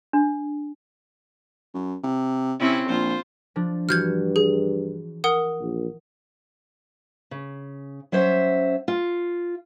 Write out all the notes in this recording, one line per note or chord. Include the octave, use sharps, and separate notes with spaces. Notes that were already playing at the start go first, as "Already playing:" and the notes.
D4
F#2
C3
C3 C4 C#4 E4
A#1 F4 C5
F3 D4
G2 E3 F#4 F6 G6 G#6
G#4
A#4 F#5 D#6
A#1
C#3
F#3 C#4 C5 E5
F4